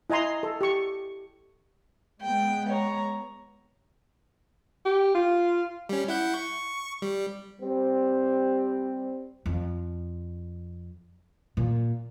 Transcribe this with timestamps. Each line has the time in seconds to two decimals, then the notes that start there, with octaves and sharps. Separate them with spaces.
0.10 E4 D#5 G#5 A#5 C6
0.43 A4
0.61 G4 C#6
2.21 G#3 B3 G5
2.68 C#5 A#5
4.86 G4
5.15 F4
5.89 G3 C#4
6.08 E4 F#5 G6
6.34 C#6
7.02 G3
7.61 G3 C4
9.46 F2
11.57 A#2